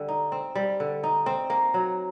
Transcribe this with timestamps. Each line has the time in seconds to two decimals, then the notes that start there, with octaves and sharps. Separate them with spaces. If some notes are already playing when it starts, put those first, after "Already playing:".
Already playing: D3 G3
0.09 D#4
0.32 C4
0.55 G3
0.80 D3
1.04 D#4
1.26 C4
1.50 A#3
1.74 F#3